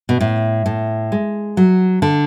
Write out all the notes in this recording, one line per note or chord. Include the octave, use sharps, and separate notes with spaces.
B2
A2
A2
G#3
F#3
D3